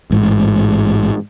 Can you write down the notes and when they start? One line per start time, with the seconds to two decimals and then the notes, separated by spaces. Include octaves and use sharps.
0.11 A1 G#2